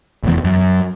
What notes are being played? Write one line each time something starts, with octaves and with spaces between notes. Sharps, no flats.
F1 E2
F#2